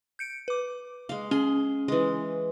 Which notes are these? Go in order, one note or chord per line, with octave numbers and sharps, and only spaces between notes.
G6 C#7 D7
B4 D6
G#3 F5
C#4 G#4 G7
E3 G#3